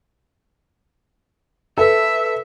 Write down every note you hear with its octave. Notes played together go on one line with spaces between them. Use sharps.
A4 B4 E5